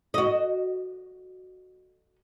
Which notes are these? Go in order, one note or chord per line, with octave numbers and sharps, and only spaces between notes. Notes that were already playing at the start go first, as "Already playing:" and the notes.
F#4 D#5